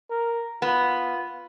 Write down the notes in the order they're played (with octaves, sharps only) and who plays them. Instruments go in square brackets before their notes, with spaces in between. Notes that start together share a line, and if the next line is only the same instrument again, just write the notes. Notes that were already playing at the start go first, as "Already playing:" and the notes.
[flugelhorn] A#4
[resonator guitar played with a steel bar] B3 [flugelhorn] F4